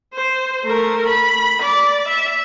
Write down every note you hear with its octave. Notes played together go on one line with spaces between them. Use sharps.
C5
A3 A#4
B5
D5
E5